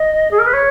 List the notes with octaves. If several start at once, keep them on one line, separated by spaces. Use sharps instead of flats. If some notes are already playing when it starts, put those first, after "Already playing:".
Already playing: D#5
G#4
A#4
B4
C#5